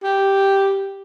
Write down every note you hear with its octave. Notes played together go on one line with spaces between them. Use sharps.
G4